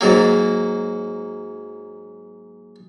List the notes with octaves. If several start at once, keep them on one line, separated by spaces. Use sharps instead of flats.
G#2 F#3 A#3